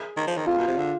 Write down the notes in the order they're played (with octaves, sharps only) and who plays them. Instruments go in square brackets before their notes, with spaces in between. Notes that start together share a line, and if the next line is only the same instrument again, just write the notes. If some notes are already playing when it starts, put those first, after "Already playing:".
Already playing: [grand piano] G#4
[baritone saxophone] D#3
F3
D#3
[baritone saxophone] F2 [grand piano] F4
[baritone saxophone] B2
C3
D3